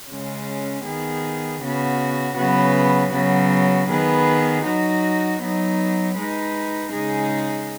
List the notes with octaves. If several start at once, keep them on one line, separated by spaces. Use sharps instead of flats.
C#3 G#3 C#4
D#3 B3 G#4
C#3 B3 F#4
C#3 F#3 B3 F#4 B4
C#3 F#3 B3 F#4
D#3 B3 G#4 B4
F#3 D#4 F#4
F#3 B3 D#4
G#3 D#4 B4
C#3 G#3 D#4 G#4